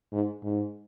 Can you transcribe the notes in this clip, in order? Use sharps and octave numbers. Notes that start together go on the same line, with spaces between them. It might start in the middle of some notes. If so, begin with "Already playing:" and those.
G#2
G#2